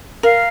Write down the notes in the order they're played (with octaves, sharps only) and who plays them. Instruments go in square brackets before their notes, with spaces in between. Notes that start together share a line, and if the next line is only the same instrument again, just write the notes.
[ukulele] A#4 [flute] F5